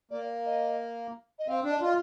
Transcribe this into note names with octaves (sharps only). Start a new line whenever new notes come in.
A#3 D5
D#5
D#5
C4 F5
D4
D#5
D5
F4 D#5